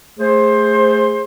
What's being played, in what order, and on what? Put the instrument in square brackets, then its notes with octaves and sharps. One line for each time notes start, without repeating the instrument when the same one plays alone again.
[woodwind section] A3 G#4 C5